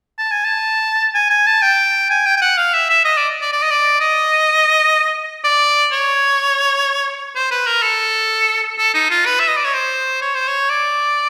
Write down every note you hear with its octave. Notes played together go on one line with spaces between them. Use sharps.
A5
G#5
A5
G#5
G#5
A5
G5
G#5
G5
G5
F#5
F5
E5
E5
D#5
D5
D5
D5
D#5
D5
D#5
D5
C#5
C5
B4
A#4
A4
A4
D#4
F4
B4
E5
D#5
D5
C#5
C5
C#5
C5
C#5
D5